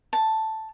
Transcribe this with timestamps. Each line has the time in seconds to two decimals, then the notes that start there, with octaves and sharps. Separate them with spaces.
0.13 A5